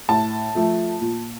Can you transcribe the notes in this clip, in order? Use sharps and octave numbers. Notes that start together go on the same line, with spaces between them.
A2 A5
F3 A3
A#2